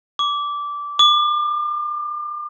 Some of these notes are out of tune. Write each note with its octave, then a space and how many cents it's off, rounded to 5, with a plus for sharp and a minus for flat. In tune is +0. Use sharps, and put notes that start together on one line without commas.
D6 -15
D6 +35